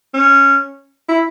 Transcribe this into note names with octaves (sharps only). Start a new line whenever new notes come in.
C#4
E4